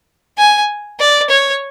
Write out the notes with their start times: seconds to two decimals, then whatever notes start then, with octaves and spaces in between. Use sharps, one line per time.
0.38 G#5
1.00 D5
1.30 C#5